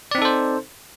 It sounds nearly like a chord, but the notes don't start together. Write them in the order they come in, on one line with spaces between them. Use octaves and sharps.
D5 C4 D#4 A4 C5